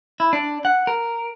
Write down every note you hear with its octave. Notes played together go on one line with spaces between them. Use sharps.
E4
D4
F#5
A#4